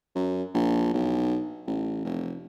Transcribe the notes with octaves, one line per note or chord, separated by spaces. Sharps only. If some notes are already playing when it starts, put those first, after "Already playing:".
F#2
A#1
B1
A1
F1